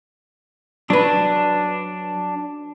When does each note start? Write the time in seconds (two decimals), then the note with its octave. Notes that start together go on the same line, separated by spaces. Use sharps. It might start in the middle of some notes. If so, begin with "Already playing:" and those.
0.90 F#3 D4 B4